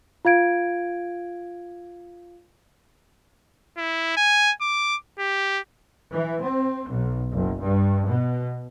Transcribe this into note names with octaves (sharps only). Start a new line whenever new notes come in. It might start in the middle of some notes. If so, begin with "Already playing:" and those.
F4 F5 G#6 D7
E4
G#5
D6
G4
E3
C4
B1
F#1
G2
B2